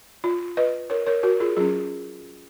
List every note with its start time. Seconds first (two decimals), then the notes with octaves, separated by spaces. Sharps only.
0.24 F4
0.57 B4 D#5
0.90 A#4 C#5
1.07 A#4 C#5
1.23 F#4 A#4
1.40 F4 G#4
1.57 F#3 C#4 F4 G#4